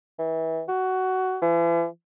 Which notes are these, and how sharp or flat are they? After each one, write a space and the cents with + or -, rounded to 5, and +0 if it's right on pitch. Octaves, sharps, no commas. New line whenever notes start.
E3 -30
F#4 +15
E3 +40